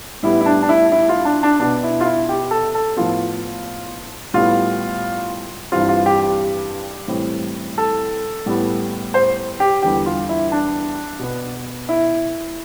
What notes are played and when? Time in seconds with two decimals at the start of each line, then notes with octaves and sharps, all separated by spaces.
0.23 A2 G3 B3 E4
0.41 E4
0.46 D4
0.62 D4
0.69 E4
0.92 E4
1.09 F4
1.25 D4
1.43 D4
1.60 B2 B3 D4
1.83 E4
2.01 F4
2.05 E4
2.29 G4
2.51 A4
2.75 A4
2.97 A2 F3 B3 F4
4.34 A2 G3 B3 F4
5.72 G2 E3 G3 C4 F4
5.89 F4
6.06 G4
6.23 G4
7.08 A2 E3 G3 C4
7.78 A4
8.46 A2 G3 B3
9.14 C5
9.60 G4
9.82 E2 D3 G3 G4
10.06 F4
10.29 E4
10.52 D4
11.19 B2 B3
11.89 E4